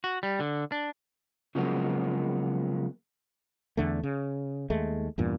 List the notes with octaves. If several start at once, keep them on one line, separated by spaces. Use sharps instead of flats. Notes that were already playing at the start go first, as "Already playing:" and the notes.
F#4
G3
D3
D4
C#3 F3 F#3 G#3 A#3 B3
E2 D3 A3
C#3
D#2 G#3 A3
E2 G2 A#2